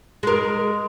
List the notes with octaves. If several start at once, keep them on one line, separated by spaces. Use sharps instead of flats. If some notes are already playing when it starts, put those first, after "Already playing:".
G#3 A#4